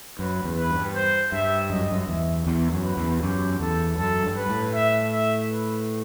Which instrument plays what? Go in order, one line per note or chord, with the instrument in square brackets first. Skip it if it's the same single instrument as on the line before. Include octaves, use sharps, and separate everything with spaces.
[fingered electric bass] F#2 [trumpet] B4
[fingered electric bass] E2
[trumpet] B4
[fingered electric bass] G2
[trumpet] C5
[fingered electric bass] G2 [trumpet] E5
[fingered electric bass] F#2 [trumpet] D#5
[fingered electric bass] G2
F#2
[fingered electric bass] E2 [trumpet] E5
[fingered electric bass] E2
F#2
[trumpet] B4
[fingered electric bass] E2
[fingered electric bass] F#2 [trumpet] G4
[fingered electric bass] E2 [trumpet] A4
[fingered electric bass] F#2 [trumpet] A4
[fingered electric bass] G2
[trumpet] B4
[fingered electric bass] A2
[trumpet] E5
E5
B4